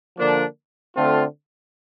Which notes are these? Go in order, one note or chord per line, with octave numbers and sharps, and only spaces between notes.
D3 F3 A#3 D4
D3 A3 C4 F4